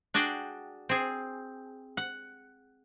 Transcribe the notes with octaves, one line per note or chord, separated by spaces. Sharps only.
D4 F#4 G#4 D5 G5
C4 G#4
F#5